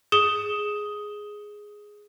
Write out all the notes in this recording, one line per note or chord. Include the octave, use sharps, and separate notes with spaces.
G#4 D#6 E7 G7